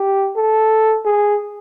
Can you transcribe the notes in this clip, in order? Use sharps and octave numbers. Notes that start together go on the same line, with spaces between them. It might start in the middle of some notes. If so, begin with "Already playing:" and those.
Already playing: G4
A4
G#4